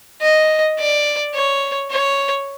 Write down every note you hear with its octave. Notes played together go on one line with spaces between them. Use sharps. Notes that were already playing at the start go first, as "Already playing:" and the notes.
D#5
D5
C#5
C#5